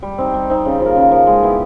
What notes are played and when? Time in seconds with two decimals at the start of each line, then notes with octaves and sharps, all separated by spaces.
0.02 G3
0.18 C4 D#4
0.34 G3
0.50 C4 D#4
0.65 C#3
0.80 F3
0.85 A#3
0.96 C#3
1.11 F3 A#3
1.27 G#3
1.43 B3 E4 G4